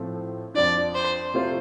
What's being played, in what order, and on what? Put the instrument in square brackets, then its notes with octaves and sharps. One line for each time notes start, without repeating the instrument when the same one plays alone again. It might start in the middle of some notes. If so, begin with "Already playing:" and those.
Already playing: [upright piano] A2 F3 C4 A4
[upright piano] F2 F3 D4 [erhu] D5
[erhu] C5
[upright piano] C3 A3 F4 C5